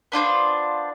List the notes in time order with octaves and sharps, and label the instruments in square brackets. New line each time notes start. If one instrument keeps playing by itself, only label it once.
[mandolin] B3 D4 F4 C5